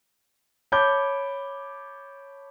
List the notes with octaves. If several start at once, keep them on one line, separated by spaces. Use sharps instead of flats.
C#5 A5 B5 D6 G6